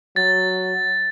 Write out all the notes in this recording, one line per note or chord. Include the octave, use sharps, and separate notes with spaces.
F#3 A6